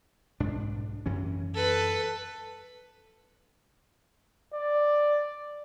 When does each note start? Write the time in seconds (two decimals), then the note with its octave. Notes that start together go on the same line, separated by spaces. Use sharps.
0.40 B1 G#2 D4
1.06 F#2 E3 C#4
1.54 A4 B4
4.53 D5